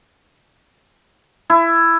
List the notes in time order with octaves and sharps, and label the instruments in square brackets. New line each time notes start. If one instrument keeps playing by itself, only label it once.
[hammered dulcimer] E4